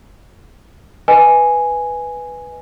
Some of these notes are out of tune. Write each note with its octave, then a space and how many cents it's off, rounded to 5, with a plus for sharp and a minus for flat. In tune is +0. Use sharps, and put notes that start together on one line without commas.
B4 +0 D#5 +0 G#5 +0